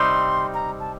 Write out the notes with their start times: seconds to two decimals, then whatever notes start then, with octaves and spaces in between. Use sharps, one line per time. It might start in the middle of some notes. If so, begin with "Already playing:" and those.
Already playing: C3 G3 C4 D#4 C6
0.54 A#5
0.80 A5